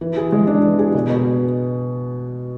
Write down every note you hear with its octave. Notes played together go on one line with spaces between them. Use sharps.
E3
G#4
G#3
D4
E3
G#4
B2
B2